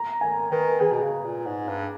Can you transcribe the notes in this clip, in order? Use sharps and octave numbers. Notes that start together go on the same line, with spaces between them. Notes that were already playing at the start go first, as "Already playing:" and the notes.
Already playing: A#5
D#3 G#5
D#3 B4
E3 G#4
B2
C#3
A#2
G#2
G2